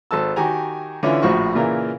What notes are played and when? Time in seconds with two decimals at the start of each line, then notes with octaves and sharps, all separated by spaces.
0.11 G#1 A4 A5 E6
0.36 D#3 F#4 G4 G#5 A#5
1.03 D3 E3 C#4 E4 F4
1.22 A#1 A2 F3 F#4 C#6
1.55 A#2 C#3 E3 F4 A#4